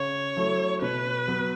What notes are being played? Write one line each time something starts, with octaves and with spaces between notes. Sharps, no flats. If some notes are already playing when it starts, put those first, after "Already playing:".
Already playing: C#3 C#5
F#3 A3 E4 A4
B2 B4
F#3 B3 F#4